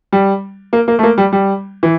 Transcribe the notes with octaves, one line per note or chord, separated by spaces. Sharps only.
G3
A#3
A#3
A3
A#3
G3
G3
E3